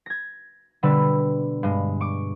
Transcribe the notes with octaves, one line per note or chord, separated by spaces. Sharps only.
G#6 A#6
B2 D3 G3 B4 E6
G2 G#3
C#6 D6